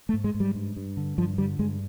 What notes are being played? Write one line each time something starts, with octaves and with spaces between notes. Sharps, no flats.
A3
G#2
G#3
G#2
G3
G2
G2
D3
G2 F3
D3 G3
G2 G#3